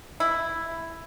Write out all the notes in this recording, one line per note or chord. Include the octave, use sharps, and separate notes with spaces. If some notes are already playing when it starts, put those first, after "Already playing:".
E4